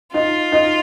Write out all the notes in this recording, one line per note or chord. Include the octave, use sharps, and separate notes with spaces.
D#4 F4
D#4